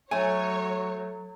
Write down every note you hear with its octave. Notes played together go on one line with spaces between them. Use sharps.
F#3 A3 C#5 G#5